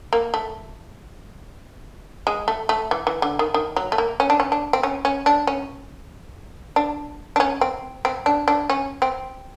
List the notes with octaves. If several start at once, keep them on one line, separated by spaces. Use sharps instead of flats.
A#3
A3
G#3
A3
A3
E3
E3
D3
D#3
D#3
F#3
A3
A#3
C#4
D4
C#4
D4
C4
C#4
C#4
D4
C#4
D4
D4
C#4
C4
C4
D4
D4
C#4
C4